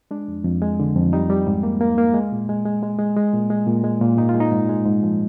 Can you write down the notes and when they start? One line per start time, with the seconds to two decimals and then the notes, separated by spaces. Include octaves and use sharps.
0.11 G#3 D4
0.28 F2
0.45 F2
0.62 G#3
0.80 D3
0.96 F2
1.13 G3 D#4
1.30 G3
1.47 G#2
1.63 A#3
1.81 A#3
1.98 A#3
2.14 G#3
2.32 A#2
2.49 G#3
2.65 G#3
2.83 G#3
2.99 G#3
3.16 G#3
3.34 A#2
3.50 G#3
3.67 A#2
3.84 G#3
4.01 A#2
4.17 G#2 D#4
4.29 F4
4.35 G#3
4.40 D#4
4.52 G#2
4.69 G#3
4.86 G#2
5.03 F3